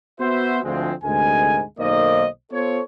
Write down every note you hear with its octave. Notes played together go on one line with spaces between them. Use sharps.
B3 F#4 C5 E5
D2 F3 G#3 C4
D2 G#2 C3 G#3 A#4 G#5
B1 D#3 A#3 C5 D5 D#5
B3 F4 A4 C5 C#5